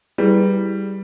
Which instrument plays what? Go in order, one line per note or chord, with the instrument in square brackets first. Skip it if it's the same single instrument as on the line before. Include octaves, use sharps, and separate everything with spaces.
[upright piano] G3 [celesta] E4 G#4 B4